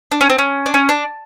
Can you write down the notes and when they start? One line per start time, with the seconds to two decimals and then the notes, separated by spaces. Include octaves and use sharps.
0.12 D4
0.21 C#4
0.30 C4
0.38 C#4
0.66 D4
0.74 C#4
0.89 D4